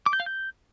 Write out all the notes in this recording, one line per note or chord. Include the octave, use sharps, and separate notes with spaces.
D6
G6
F5
G6